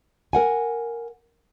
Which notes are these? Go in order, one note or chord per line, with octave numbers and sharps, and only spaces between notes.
A#4 F#5 G#5